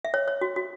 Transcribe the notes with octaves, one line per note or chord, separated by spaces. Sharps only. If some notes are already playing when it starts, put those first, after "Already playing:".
E5
C#5
C#5
F#4
F#4